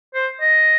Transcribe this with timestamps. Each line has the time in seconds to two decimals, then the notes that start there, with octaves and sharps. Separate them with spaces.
0.14 C5
0.41 D#5